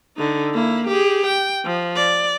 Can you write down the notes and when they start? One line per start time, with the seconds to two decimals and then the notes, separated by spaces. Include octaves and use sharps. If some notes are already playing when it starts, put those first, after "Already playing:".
0.17 D3 D#4
0.54 A#3 E4
0.87 G4 G#4
1.26 G5
1.65 F3
1.96 D5